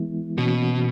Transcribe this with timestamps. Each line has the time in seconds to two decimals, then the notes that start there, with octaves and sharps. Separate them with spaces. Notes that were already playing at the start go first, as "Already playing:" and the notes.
Already playing: E3 G#3 B3 E4
0.37 B2 E3 A#3 C#4 F#4